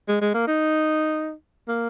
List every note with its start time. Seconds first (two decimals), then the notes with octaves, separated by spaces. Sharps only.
0.08 G#3
0.21 G#3
0.34 A#3
0.47 D#4
1.68 A#3